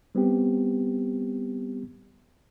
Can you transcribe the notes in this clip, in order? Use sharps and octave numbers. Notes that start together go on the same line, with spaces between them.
G3 B3 C4 G4